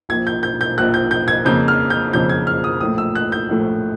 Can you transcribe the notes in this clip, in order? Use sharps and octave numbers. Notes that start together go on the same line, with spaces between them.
A#1 A#2 F3 G#6
G6
G6
G6
A#1 A#2 F3 F#6
G6
G6
G#6
F2 C#3 F3 A#3 G6
F6
G6
F2 C#3 F3 A#3 G6
G#6
F6
D#6
A#1 A2 F3 A3 D#6
E6
F#6
G6
A#1 A2 F3 A3